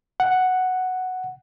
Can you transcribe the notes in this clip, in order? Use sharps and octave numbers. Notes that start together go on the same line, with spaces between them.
F#5